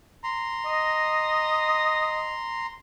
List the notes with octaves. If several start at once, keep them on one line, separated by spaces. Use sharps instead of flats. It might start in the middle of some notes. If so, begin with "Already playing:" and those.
A#5 C6
D#5